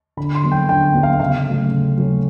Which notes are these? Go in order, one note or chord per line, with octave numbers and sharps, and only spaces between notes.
D3 B5
C6
F#3 B3
G5
D3 G5
F#3 B3
F5
C#3 F5
F#3 A3 C#4
C#3
F#3 A3 C#4